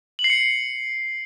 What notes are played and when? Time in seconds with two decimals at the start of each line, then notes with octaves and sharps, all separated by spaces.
0.19 F#7
0.24 C7
0.30 C#7
0.35 C7